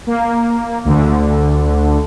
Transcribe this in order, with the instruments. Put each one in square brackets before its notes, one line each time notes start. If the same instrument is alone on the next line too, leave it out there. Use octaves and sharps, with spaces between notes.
[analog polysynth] A#3
D2 D3